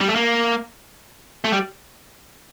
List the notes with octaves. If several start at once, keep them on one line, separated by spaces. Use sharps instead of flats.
G3
A3
A#3
A3
G3